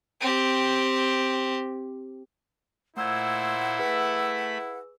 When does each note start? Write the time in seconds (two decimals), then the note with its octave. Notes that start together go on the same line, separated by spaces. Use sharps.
0.21 C4 G4
2.97 A#2 A3 E4 C5 F#5 E6 G#6
3.79 A3 G#4 B4 B5 E6